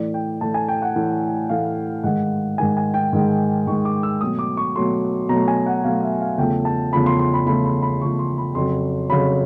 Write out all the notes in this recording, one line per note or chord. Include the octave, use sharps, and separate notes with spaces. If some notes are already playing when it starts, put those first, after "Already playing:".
Already playing: A2 E3 A3 D5
G5
A2 E3 A3 A5
G#5
G5
F#5
A2 E3 A3
A2 E3 A3 F5
G#2 D#3 G#3 F#5
G#2 D#3 G#3 G#5
G#5
G5
G#2 D#3 G#3
G#2 D#3 G#3 C#6
D6
E6
B2 F#3 A3 D#6
D6
C#6
B2 F#3 A3 C6
B2 F#3 A3 A#5
G#5
F#5
B2 F#3 A3 F5
E5
F5
E2 C#3 F3 A3 G5
A5
E2 C#3 F3 A3 B5
C6
C6
B5
E2 C#3 F3 A3 B5
B5
B5
E2 C#3 F3 A3 C#6
C6
B5
F2 C#3 F#3 C6
F2 C#3 F#3 B5